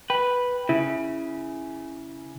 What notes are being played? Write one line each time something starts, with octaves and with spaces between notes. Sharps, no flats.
B4 G5
C#3 E4